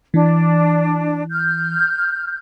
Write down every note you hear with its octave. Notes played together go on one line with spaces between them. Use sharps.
E3 D4
F6 G6